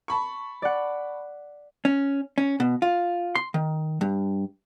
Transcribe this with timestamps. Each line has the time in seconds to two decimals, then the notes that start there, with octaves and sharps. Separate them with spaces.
0.08 A5 B5 C#6
0.62 D5 F#5
1.85 C#4
2.38 C#4
2.60 B2
2.82 F4
3.35 C6
3.54 D#3
4.01 G2